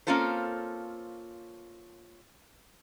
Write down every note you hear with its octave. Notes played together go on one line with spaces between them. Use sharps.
A#3 C4 C#4 F4 A4 C5